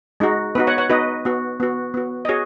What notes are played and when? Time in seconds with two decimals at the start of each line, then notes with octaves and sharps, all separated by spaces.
0.20 G#3 D#4 F#4
0.55 B3 B4
0.58 D#4 F#4
0.67 C#5 F#5
0.78 C#5 F#5
0.90 B3 D#4 F#4 B4 D#5
1.25 B3 F#4
1.60 B3 F#4
1.94 B3 F#4
2.25 D#5
2.29 F#4 G#4 C#5